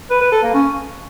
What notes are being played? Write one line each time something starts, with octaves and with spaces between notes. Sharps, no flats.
B4
B4
A4
A#3
C#4